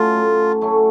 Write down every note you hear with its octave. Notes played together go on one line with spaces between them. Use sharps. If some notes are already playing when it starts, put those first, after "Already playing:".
Already playing: F#3 A3 C#4 F4
A2
F#3 A3 C#4